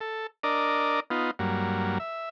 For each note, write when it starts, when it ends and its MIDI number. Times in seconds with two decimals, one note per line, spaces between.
0.01 0.27 69
0.43 1.00 62
0.43 1.00 70
0.43 1.00 74
0.43 1.00 75
1.10 1.31 59
1.10 1.31 63
1.10 1.31 65
1.39 1.98 43
1.39 1.98 54
1.39 1.98 58
2.00 2.29 76